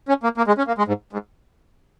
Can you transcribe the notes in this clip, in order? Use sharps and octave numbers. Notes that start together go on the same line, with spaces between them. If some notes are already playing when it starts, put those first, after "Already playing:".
C#4
A#3
A#3
G#3
C#4
A#3
G#3
G#2
G#2